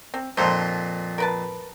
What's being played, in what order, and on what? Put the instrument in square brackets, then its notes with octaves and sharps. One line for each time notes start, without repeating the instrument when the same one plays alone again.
[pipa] C4
[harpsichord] F2 A#2 [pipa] D#4 A4 C5
[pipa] A#4 B4 A5